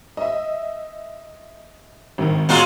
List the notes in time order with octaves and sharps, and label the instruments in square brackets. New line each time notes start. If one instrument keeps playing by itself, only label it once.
[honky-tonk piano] D#5 E5
G#1 D#3
[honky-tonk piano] B2 [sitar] F#3 G#3 F4